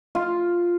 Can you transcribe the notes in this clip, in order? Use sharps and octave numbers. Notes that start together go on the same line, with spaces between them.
F4